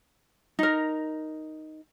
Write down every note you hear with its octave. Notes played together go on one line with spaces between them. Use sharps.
D#4 A#4